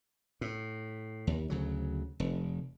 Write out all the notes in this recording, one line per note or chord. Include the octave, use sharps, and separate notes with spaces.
A2
D#2
D2 C#3 F#3
F1